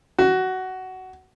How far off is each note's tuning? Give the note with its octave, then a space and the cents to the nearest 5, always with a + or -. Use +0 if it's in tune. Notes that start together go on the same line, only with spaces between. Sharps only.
F#4 +15